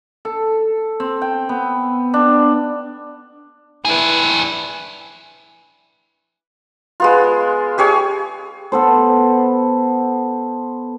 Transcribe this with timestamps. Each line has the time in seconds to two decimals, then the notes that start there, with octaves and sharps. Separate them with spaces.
0.25 A4
1.00 C4
1.21 G5
1.49 B3
2.14 D4
3.85 D4 E4 G#4 B4
7.00 G#3 B3 F4
7.78 G4 G#4 C#5 G#5
8.72 B3 A4 C5